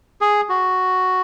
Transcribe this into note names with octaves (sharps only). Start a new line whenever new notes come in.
G#4
F#4